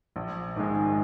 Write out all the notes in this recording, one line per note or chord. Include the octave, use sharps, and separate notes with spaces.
A#1
G#2 D#3 G#3